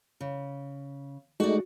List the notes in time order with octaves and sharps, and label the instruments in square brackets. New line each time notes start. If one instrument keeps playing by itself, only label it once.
[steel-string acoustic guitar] C#3
[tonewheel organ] G#3 A3 D#4 [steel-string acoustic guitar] F#4 D5